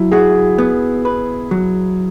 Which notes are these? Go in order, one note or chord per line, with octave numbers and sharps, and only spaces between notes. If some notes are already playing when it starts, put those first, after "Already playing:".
Already playing: F#3 E4
F#4 G#4
B3
B4
F#3